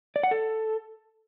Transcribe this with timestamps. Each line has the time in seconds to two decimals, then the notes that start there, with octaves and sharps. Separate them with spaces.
0.16 D5
0.23 F#5
0.31 A4